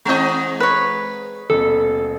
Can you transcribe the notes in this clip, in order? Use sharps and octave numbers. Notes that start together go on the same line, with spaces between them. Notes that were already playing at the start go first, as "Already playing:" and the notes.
E3 G#3 C4 D#5 A#5
B4 C#5
D#1 B2 A4